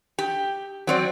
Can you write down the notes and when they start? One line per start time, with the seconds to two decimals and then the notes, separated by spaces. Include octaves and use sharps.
0.19 G4
0.87 F#3 C4 D5